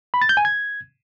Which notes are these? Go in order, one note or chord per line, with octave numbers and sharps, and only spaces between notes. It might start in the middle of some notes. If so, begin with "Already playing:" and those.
B5
A6
G6
G#5
G#6